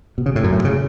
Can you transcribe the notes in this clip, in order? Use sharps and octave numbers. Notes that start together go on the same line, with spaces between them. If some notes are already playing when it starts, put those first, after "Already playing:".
B2
C#3
A2
F#2
A2
C#3